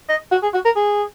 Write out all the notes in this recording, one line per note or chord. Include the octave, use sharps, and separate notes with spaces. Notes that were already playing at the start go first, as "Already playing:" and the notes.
D#5
F#4
G#4
F#4
A#4
G#4